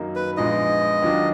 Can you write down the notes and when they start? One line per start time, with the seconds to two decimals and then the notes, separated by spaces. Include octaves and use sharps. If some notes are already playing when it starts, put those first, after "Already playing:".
Already playing: F#2 D#3 F#3 A#3 D#4
0.15 B4
0.37 A#1 A#2 G#3 B3 D#4 D#5
1.02 D#2 D#3 F#3 D4 F#4